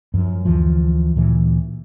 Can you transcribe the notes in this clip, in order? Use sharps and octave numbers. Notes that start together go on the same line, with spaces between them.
F#2 F3
D2 E3 F3
D2 A#2 E3